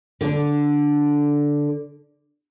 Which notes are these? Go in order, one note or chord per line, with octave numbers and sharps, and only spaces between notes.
D3 D4